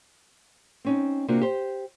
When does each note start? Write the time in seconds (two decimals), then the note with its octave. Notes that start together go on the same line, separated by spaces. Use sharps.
0.85 C4 C#4 D#4
1.28 C3 A#3 D4 F4 F#4
1.41 G4 C5